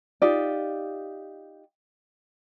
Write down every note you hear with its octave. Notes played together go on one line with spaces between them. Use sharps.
D#4 F4 G4 D5